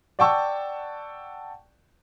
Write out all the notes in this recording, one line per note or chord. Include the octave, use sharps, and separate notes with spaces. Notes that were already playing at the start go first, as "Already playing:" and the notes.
D5 F#5 G5 A5 C#6 E6